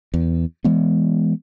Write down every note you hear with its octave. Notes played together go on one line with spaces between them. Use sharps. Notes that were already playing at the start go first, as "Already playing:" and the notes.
E2
E3 G#3 B3